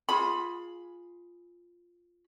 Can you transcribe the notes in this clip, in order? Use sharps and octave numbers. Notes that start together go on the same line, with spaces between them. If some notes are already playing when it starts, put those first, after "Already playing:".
F4 G#4 B5